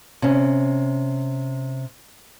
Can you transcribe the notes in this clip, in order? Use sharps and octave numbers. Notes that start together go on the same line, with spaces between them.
C3 C#4